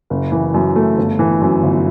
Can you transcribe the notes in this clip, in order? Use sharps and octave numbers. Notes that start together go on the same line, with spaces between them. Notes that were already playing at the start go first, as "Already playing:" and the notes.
F#1
E3
F#2
A3
G1
E3
F#2
G1